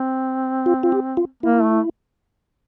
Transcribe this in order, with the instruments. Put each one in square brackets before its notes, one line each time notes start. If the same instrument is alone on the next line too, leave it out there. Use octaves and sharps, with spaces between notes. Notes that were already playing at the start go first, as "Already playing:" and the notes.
Already playing: [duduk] C4
[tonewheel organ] F4
F4
G4
F4
[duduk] A#3 [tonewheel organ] E4
[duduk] A3